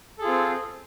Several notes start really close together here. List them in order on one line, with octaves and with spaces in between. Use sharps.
A4 G#4 F4 C4